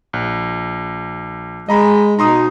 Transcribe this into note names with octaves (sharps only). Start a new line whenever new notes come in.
A#1
G#3 D#5 A#5 B5
B2 D#4 A#5 C6 D#6